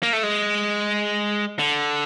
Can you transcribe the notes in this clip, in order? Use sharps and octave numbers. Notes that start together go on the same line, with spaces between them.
A#3
A3
G#3
D3